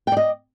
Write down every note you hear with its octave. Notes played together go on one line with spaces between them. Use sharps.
D5 D#5 G5